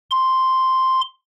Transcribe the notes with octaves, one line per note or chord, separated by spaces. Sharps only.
C6